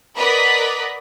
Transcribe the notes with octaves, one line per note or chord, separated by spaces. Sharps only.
A#4 B4 D5 D#5 F#5 B5